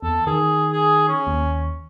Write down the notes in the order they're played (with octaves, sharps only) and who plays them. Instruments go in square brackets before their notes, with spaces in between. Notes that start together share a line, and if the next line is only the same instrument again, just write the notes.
[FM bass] E2 [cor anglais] A4
[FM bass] D#3 [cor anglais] G#4
[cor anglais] G#4
C#4
[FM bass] D#2